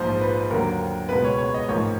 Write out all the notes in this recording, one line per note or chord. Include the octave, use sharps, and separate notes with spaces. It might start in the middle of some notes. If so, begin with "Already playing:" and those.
Already playing: A#1 G#2 F3 C5
B4
D#2 D3 F#3 A#4
C#2 B2 G#3 B3 B4
C#5
C#5
D#5
A1 G#2 F3 A#3 C#5